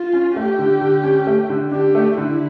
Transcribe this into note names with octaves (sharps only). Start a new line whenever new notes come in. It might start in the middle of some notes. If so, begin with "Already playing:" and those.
Already playing: F4
C#4
A3 G4
D3
D3
C#4
A3
D3
D4 G4
A3
D3 E4